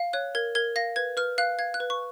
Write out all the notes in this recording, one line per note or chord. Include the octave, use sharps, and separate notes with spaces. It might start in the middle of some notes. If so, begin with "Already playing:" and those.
Already playing: F5
C#5 F#6
A#4 G#6
A#4 G#6
F5 A#6
B4 G#6
B4 F6
F5 F#6
F5 G#6
F#6
B4
C#6